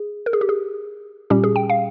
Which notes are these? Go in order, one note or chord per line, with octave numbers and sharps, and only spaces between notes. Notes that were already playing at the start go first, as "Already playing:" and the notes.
Already playing: G#4
A#4
G#4
G4
G#4
A#2 G3 C#4 G4
G#4
G5
F5